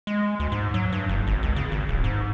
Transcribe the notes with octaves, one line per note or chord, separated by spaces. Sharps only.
G#3
D2
G#2
F#3
G2
F#1
G#1
C#2
C#3
G#1
D1
G#2